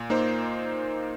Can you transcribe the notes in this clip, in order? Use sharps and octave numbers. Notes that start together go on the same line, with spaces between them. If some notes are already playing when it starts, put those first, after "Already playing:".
Already playing: A#2
A#3 D#4 C5